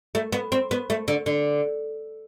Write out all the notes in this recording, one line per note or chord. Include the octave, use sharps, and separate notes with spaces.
A3
B3
C4
B3
A3
D3
D3